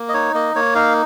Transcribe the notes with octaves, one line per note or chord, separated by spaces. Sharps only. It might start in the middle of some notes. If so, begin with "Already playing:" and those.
Already playing: A#3
D#5
D#4 C#5
A#3 D#5
A#3 C#5
D#4 F5